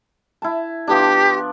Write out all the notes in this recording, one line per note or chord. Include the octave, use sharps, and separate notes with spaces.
E4 A5
F3 B3 D4 G4